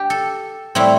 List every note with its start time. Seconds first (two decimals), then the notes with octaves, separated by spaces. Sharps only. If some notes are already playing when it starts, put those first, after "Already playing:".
Already playing: G4
0.10 A4
0.75 A2 G3 C4 E4